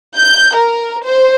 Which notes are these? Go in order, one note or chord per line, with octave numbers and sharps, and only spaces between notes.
G6
A#4
C5